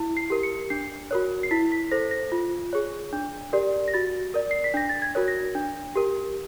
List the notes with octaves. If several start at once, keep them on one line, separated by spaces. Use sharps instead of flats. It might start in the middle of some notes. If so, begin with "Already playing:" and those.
Already playing: E4
C7
G4 A#4
C#7
D4 C7
F#4 A#4 C#5
C7
E4 B6
B6
A4 C5 A#6
A#6
F4
G#4 C#5
D4
G4 A#4 D5
A#6
F#4 A6
A#4 D5
C7
B6
D4 A#6
A6
G#6
F#4 A#4 C#5
A#6
D4
G4 A#4